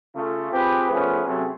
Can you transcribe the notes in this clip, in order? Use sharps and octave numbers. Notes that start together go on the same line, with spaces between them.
C#3 A3 F4
C4 F4 G4 G#4 B4
F3 A3 B3 C#4 G#4 B4
C3 F#3 A3 C4 C#4 G#4